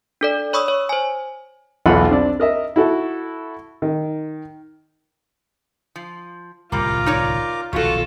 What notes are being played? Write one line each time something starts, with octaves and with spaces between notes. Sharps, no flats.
D4 A4 D5
C#5 B5 C#6 D#6 E6
C#5
C5 G#5
B1 E2 F4 F#5 B5
C4 D4 D5
A#4 D#5 E5
E4 F#4 A4
D#3
F3
D1 C2 G3 A#3 F4 A#4 A#5 D6
D#4 C#5 D5
D#1 B1 D#3 F3 F4 F#4 A4 C#6